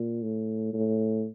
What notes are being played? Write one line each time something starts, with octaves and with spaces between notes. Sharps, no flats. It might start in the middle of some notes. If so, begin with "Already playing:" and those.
Already playing: A#2
A2
A2